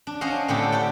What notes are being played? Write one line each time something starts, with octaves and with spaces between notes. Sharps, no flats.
D4
C#4 D4 C5 D#5 F5 F#5
A2 D3 C4 D4 G4 A4
G4 A4 F#5 G5